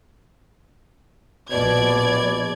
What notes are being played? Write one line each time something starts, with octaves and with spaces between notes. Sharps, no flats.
A#1 B2 D5 G#6